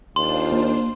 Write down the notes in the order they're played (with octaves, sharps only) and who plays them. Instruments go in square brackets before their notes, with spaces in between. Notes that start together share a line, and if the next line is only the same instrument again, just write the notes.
[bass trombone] D#2 [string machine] D4 F4 C5 [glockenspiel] C6
[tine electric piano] A#3